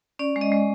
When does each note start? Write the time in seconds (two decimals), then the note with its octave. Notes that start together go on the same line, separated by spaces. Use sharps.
0.19 C#4 D5
0.36 G#3
0.41 D#5
0.52 G#3